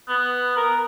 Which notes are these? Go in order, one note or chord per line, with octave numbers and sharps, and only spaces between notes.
B3
A#4